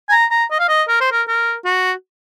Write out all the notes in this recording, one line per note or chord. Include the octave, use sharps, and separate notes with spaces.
G#5
A#5
A#5
D#5
F5
D#5
A#4
C5
A#4
A#4
F#4